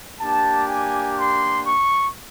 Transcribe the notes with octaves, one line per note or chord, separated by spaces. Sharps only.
A#3 D4 G4 A5
G#5
C6
C#6